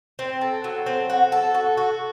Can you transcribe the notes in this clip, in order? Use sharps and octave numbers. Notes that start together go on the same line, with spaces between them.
C4
A4
F#3
C4
F#4
A4
F#4
F#4